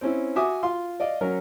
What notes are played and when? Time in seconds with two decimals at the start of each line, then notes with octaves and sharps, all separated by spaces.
0.01 C4 C#4 E4
0.36 F#4 E5 G#5 D6 D#6
0.63 F4 C6
1.00 D5 D#5 F5
1.21 F#3 C#4 A#4